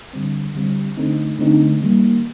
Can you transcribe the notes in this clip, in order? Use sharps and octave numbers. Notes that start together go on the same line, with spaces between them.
D3 G3 C4
D3 G3 C4
D3 A3 C4 D#4
D3 A3 C4 D#4
D#3 G3 A#3